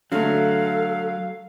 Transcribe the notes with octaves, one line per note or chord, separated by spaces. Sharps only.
D3 F#3 A3 A4 F5